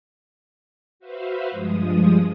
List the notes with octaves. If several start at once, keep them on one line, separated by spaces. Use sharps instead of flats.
F#4 B4 C5 E5 F5
G2 F3 G#3 D#6